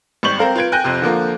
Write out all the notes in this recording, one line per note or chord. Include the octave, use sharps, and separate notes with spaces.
G#1 G3 C#6 G6 F#7
C4 A#4 F5
F4 B4 G#6 D7
G5 G#5 F#6 G6 A#6 D#7
F2 C3
D3 F3 A#3